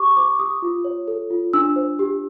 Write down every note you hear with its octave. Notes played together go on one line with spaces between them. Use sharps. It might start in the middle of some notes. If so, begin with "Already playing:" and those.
Already playing: G4 C5 C#6 D6
C5 D6
G4 D#6
F4
C#5
A4
F4
D4 E6
C5
G4